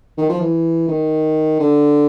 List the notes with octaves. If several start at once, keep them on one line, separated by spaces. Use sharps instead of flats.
D#3
F3
E3
D#3
D3